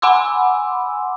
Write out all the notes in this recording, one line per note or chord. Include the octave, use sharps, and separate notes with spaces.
F#5 G#5 B5 C6 D6 E6